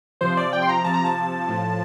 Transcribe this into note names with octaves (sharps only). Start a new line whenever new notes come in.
C3 F3 C5
D5
G5
C6
A#5
C3 F3 A5
A#5
A5
A2 F3